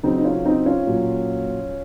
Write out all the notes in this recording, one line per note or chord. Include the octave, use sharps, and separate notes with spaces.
C#3 F#3 C4 D#4
D#4
C#4 F4
C4 D#4
C#4 F4
A#2 F#3